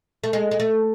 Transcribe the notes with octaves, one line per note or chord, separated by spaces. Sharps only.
A3
G#3
G#3
A3